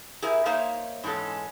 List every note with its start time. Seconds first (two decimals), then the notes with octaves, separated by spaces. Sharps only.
0.22 E4 G4 G#4 A#4 B4 E5
0.45 A#3 D#4 C5 C#5 E5 F5
1.04 G#2 E3 G#3 C#4 A4